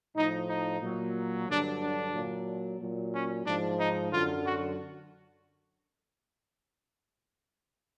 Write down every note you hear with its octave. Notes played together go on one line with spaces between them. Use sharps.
A2 F3 D#4
D#4
A#2 F#3
G2 D3 F#3 D4
D4
A#2 F#3
A#2 F#3
C#4
G#2 F3 D4
D#4
F#2 D3 F#3 F4
F#4